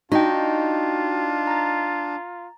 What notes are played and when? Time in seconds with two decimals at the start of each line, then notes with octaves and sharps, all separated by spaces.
0.12 D4 D#4 F4 F#4 D#5 G5
1.47 A#5 A6